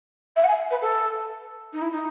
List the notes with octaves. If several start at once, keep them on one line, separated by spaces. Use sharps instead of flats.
E5
F#5
G#5
B4
A4
D#4
E4
D#4